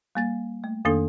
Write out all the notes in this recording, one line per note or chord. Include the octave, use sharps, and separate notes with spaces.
G3 A#3 A6
A3
F2 D#3 A#3 D4 A4 D#6